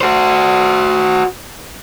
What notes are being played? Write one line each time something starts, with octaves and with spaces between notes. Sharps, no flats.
F#4 C5